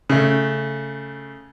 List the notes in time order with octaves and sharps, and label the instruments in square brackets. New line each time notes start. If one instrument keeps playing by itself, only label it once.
[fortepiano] C#3 A3